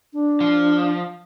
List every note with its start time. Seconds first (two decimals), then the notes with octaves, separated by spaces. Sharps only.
0.13 D4
0.41 F3